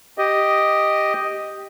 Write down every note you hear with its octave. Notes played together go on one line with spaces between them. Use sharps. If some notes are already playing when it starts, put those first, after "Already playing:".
G4 D#5